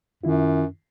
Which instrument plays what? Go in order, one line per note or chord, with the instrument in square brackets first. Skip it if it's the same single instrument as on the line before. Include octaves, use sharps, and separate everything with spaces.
[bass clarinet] F#2 [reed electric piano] D#3 E4 F4